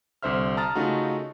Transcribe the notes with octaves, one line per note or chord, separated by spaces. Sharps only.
C2 D3 C5 E5 F6
A5 A#5 D#6 F6 A6
C#3 A3 D#4 F4 F#4